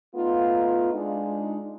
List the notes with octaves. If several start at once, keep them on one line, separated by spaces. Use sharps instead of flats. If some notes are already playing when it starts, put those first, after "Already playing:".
A3 B3 D#4 F4
G#3 D4 D#4